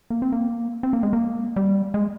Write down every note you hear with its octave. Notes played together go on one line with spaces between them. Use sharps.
A#3
C4
A#3
C4
A#3
G#3
A#3
G3
G#3